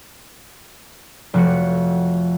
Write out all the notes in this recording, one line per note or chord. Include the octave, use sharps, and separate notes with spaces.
F1 F3 F#4 C#7